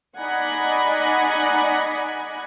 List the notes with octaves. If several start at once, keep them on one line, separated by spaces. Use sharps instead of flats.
D#4 D5 D#5 F#5 G#5 B5